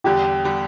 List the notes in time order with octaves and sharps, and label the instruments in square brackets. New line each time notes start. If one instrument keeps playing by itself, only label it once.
[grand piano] E2 D3 G3 [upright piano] G4
[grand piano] D3 G3